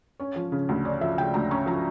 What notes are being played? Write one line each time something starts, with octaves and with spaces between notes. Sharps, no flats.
C#4 C#5
F3
C#3
D2
C#4 D5
F3 E5
C#3 G5
D2 A#5
C#4 C#6
F3 A#5